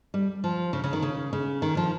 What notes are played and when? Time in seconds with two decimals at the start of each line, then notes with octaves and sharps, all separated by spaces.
0.14 G3
0.44 F3
0.73 C#3
0.84 C#3
0.93 D#3
1.02 C#3
1.33 C#3
1.62 D#3
1.77 F3